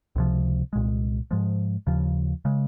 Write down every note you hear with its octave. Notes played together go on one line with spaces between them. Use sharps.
C#2 C3 F3
C2 A#2 G#3
G#2 F3 G#3
D#2 C#3 F3
C#3 G#3